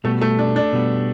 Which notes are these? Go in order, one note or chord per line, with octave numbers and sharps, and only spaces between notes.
B2 G3 A3 B3
A3
D4
D4
B2 G3 B3